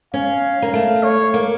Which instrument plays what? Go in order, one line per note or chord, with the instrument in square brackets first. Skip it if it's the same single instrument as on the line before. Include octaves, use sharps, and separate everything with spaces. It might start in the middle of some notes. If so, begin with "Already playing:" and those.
[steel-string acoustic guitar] C#4 [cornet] F5
[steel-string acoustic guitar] A#3
A3
[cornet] C#5
[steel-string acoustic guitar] A#3